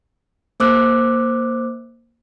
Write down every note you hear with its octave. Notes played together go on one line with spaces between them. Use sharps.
A#3 C5 D6 E6 F#6